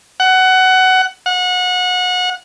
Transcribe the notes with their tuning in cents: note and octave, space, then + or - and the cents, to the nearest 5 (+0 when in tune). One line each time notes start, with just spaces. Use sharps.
F#5 +20
F#5 -25